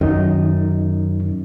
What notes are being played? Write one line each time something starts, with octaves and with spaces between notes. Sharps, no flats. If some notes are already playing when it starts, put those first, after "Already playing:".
F#2 D#3 D#4